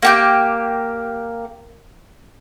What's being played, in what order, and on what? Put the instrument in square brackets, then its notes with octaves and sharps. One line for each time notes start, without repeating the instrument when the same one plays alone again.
[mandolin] A#3 G4 G6